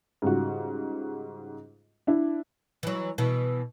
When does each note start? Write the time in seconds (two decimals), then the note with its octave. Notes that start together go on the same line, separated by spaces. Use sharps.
0.22 G#2 C#3 G3 F4 F#4
2.07 D4 E4
2.83 E3 F#3
3.18 B2 E3